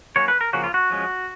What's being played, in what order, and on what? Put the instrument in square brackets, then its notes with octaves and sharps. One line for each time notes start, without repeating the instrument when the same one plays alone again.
[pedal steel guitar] F#3 A#3 C#4 C#5
B4
A#4
C#3 F3 A#3 C#4 F#4
F4
F#4
F3 G#3 C#4